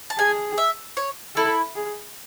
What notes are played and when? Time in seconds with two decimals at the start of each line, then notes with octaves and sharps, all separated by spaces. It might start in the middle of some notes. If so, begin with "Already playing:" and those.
0.10 A5
0.18 G#4 G#5
0.58 E5
0.97 C#5
1.36 E4 A4
1.76 G#4